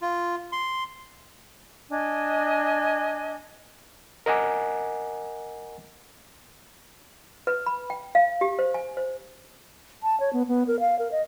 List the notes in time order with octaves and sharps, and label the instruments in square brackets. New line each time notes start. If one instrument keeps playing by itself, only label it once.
[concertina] F4
C6
[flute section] D4 D#5 G#5
[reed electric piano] A#4 D#5 F#5 G#5 D6
[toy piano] B4
B5
G5
F5
G4
C5
G#5
C5
[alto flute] A5
C#5
B3
B3
A#4
F5
A#4
D#5